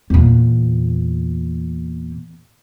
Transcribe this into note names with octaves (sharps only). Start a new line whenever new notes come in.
E2 A#2